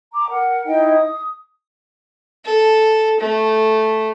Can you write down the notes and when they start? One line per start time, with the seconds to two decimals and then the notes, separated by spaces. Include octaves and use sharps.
0.13 A#5 D6
0.29 A#4 F#5
0.65 D#4 E4 D#5 G5
0.95 D#6
2.45 A4
3.20 A3